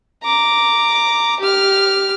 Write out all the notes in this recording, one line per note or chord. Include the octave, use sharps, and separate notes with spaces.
A#5 D6
G4 F6